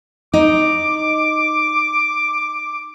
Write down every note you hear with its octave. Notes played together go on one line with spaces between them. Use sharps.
D#4 D6